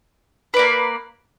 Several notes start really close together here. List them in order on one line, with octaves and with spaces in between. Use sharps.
B4 D5 A#3